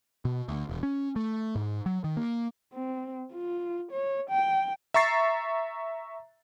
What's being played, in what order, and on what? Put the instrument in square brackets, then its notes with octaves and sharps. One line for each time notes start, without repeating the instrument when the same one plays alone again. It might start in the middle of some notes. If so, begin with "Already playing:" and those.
[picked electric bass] B2
D2
E1
C#4
A3
G#2
F#3
D#3
A#3
[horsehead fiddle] C4
F4
C#5
G5
[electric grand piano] E5 A#5 C#6 A6 C7